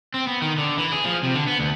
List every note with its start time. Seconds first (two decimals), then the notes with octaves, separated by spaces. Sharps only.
0.14 C4
0.27 B3
0.42 D#3
0.58 D3
0.79 E3
0.92 G#4
1.05 F3
1.23 C3
1.35 D3
1.47 B3
1.59 D2